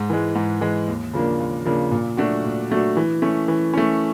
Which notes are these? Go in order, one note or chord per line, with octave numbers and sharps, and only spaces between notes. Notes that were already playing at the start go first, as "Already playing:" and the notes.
Already playing: G#2
E3 G#3
G#2
E3 G#3
D#2
C#3 F3 A#3 D4
D#2
C#3 F3 A#3 D4
A#2
F#3 A3 D4 F#4
A#2
F#3 A3 D4 F#4
E3
A3 C#4
E3
A3 C#4